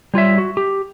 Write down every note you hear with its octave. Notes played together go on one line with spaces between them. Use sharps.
G3 F4 C#5 E5
F#4
G4